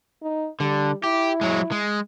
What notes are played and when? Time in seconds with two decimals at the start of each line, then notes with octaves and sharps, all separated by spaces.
0.22 D#4
0.60 D3 G3
1.04 E4 G4
1.41 F#3 G#3
1.72 G#3